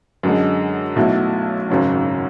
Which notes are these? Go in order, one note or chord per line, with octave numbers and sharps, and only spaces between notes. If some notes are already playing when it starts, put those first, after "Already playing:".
F#2 D3 G#3
B1 B2 A3 E4
G#1 F#2 C#3 F#3